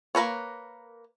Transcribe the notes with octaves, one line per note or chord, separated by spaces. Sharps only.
A#3 A#4 B4 C#5